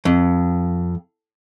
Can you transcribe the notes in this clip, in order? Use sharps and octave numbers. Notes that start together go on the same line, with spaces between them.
F2